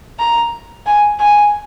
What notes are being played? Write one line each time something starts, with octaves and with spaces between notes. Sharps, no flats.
A#5
G#5
G#5